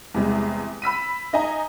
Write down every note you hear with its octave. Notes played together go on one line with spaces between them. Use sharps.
E2 C3 G3 G#3
B5 E6 B6 D#7
D#4 D#5 G#5 A#5